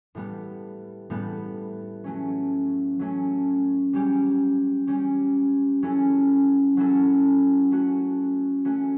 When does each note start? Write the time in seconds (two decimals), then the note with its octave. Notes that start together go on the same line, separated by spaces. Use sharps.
0.15 A2 G3 B3
1.10 A2 G3 B3
2.04 F#3 A3 C#4
2.99 F#3 A3 C#4
3.93 G3 C#4 G4
4.87 G3 C#4 G4
5.82 F#3 C#4 E4 A4
6.77 F#3 C#4 E4 A4
7.71 A3 C#4 F#4
8.65 A3 C#4 F#4